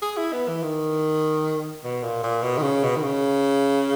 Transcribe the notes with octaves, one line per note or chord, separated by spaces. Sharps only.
G#4
E4
B3
E3
D#3
B2
A#2
A#2
B2
D#3
C#3
B2
D#3
C#3